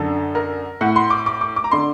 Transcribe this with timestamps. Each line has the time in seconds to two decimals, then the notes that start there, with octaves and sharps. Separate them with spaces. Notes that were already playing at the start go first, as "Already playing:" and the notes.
Already playing: F#2 D3 A4
0.35 A#4
0.81 A2 F#5
0.96 C6
1.10 D6
1.26 D6
1.41 D6
1.56 D6
1.64 A#5
1.71 D3 C6